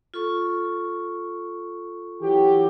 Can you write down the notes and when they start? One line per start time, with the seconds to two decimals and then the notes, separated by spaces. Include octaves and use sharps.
0.14 F4 A4 C#6
2.22 E3 F#3 G4